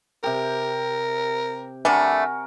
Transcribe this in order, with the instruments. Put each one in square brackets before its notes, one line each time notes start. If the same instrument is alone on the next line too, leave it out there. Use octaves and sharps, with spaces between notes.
[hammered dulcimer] C3 G4 [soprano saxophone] A#4
[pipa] D3 G3 A3 [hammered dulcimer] F#4 A#4 [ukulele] G#5